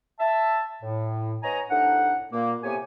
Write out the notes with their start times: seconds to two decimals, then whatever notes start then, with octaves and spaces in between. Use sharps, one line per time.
0.20 E5 A5
0.82 A2
1.43 B3 C#5 D#5 G#5 A#5
1.70 C2 A2 D4 D#4 F#5
2.32 A#2 A#3
2.63 A2 C3 B3 G4 C#5 G#5